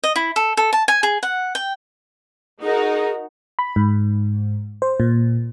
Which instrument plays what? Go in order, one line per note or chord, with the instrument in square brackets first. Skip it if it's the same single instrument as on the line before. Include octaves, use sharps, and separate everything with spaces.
[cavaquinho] D#5
E4
A4
A4
A5
G#5
G#4
F#5
G5
[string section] D#4 F#4 A#4 [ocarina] G#4
[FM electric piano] B5
G#2
C5
A#2